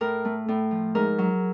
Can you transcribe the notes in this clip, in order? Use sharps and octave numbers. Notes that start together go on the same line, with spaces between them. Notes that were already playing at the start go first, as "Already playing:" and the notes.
A2 A#4
A3
A2
F3
G#2 A#4
F#3